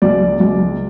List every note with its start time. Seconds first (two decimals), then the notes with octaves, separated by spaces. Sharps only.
0.02 C#2 D5
0.40 C#2